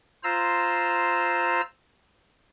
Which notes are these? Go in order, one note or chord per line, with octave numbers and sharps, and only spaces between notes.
F4 C5 A#5 E6